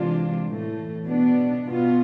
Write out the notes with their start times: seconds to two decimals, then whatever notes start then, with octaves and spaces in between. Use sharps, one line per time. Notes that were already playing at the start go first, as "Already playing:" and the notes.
Already playing: C3 E3 G#3 D4 F4
0.46 A2 E3 A3
1.06 B2 B3 D4
1.66 B2 B3 F4